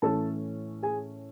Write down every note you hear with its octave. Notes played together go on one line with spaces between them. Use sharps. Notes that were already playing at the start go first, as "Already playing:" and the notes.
A2 E3 A3 C#4 A4 A5
G#4 G#5